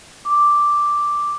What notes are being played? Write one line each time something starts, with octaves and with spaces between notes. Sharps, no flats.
D6